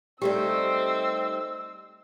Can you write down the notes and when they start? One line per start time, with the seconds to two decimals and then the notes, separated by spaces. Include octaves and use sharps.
0.22 G3 A3 C4 D#4 G4 D5 E6